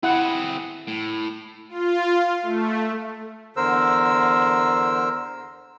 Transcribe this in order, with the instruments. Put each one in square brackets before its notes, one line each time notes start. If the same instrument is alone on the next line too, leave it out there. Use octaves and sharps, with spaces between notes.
[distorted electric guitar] C4 G#4 [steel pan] E4 F#5
[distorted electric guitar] A2
[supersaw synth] F4
A3
[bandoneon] E2 D3 A#4 C5 E6